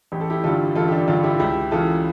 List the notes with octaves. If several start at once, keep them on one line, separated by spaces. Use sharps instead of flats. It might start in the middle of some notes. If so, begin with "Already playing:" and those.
A1 G4
A4
E4 G4
G2 D3 F4 A4
A1 F4 A4
G4
D4 F4
G2 D3 D4 F4
E4 G4
C#2 E4 G4
C#3 E3 F4 A4